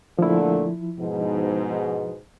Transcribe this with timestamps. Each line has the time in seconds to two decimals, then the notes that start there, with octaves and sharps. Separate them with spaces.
0.19 A#2 D3 F3 A3 E4
0.99 G#2 B2